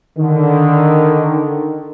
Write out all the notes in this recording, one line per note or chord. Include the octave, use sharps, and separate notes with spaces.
D3 D#3